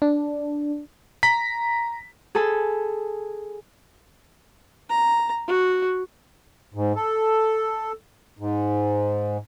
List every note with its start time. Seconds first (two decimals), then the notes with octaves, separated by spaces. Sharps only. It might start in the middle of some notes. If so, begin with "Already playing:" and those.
0.02 D4
1.23 A#5 B6
2.35 G#4 A4 A5 B5
4.90 A#5
5.48 F#4
6.74 G#2
6.96 A4
8.39 G#2